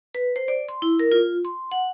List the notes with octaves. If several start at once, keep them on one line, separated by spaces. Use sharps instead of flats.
B4
C5
D5
C6
E4
A#4
F4
C6
F#5